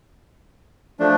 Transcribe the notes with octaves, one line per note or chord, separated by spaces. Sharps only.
F3 A3 D4